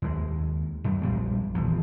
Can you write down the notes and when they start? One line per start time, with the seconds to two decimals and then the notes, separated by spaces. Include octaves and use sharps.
0.02 D#2 G#3
0.84 F#2
1.02 A#1 F3 G3 G#3
1.55 D#1 E2 F3